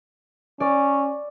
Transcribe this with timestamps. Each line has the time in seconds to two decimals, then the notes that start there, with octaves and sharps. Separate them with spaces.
0.60 C#4 D5